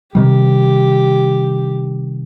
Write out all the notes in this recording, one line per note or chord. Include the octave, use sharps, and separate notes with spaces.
C3 D#3 G3 G4